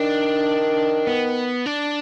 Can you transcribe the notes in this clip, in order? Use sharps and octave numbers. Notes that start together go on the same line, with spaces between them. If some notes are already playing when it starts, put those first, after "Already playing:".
Already playing: D#3 D4
B3
D4